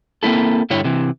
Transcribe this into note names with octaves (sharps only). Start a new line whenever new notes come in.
A#3 C4 E4 A4
G2 D3 E4 C#5
C3 E3